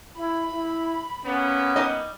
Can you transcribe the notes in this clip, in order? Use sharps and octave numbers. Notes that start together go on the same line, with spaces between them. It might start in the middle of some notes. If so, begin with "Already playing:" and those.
E4 B5
E4
A#3 B3 C#4
G3 D#4 D#5